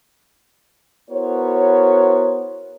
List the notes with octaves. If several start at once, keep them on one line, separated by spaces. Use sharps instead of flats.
B3 E4 F#4 A#4 C5 C#5